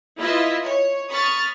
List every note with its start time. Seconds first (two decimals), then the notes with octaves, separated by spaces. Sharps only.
0.18 E4 F4 B4 D#5 E5
0.63 C#5
1.10 B5 C#6 D#6 F6 A6